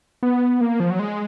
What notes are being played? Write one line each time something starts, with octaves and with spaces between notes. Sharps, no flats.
B3
A#3
F3
F#3
G#3